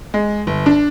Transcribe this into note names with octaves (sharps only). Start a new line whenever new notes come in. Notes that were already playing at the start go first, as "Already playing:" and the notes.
G#3
G1
D4